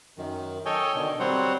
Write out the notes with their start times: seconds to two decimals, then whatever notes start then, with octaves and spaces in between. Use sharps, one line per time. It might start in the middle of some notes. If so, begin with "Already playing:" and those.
0.18 F#2 D#3
0.66 A4 C#5 D#5 G5 G#5
0.95 B2 D3 D#3
1.20 F#3 G3 C4 C5 C#5 F#5